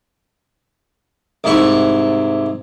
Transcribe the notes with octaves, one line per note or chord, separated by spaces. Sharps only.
C2 G#2 E4 C#6